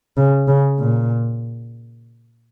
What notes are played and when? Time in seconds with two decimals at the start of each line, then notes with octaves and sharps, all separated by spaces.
0.17 C#3
0.48 C#3
0.80 A#2